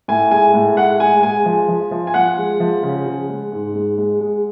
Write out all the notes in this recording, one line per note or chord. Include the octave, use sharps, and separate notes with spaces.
A2 G#5
G#3 G#5
A2
G#3 F#5
G#3 G#5
G#3 G#5
F3
F3
F3
G#5
F3 F#5
G#3
F3
C#3
C#3
G#3
G#2
G#3
G#3
G#3